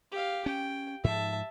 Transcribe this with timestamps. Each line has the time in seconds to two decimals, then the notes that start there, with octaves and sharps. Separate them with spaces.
0.12 G4 F5
0.46 C#4 G5
1.04 G#2 F3 E5 A5